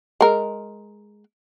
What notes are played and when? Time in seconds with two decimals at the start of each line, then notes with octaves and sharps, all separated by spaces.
0.21 G#3 A#4